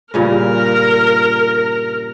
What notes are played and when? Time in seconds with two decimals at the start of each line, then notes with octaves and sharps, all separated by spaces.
0.14 G2 A#2 C#3 A#4